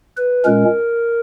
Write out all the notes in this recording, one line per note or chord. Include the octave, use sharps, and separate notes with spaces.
B4
A#2 G#3 C#4 A#4